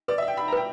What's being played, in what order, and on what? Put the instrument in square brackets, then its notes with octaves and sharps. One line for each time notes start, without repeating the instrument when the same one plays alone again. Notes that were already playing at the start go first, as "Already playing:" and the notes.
[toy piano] B4 [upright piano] D5
[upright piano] E5
[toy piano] F#5
[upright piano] G5
[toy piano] F#5 [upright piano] B5
[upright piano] A#5
[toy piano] B4 [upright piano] G5